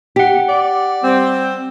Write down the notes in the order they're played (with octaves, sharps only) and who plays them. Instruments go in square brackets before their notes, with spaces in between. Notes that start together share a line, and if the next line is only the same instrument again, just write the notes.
[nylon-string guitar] G4 [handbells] F#5 B6
[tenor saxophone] D5
[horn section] G3 C4